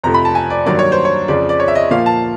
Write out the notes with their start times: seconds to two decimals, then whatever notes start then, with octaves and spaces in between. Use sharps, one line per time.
0.04 F2 C3 F3 A3 A#5
0.14 B5
0.25 A5
0.35 G#5
0.50 D5
0.66 G2 D#3 F#3 A#3 D5
0.79 C#5
0.92 C5
1.05 C#5
1.28 F2 C#3 F3 D5
1.49 D5
1.60 C#5
1.68 E5
1.75 D#5
1.91 A#2 F3 A#3 F5
2.06 A5